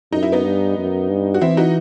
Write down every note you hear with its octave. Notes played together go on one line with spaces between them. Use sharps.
F#2 D#4
E4
B3 D#4
G2
F#2
G2
F#4
E3 C4 E4
D#4 F#4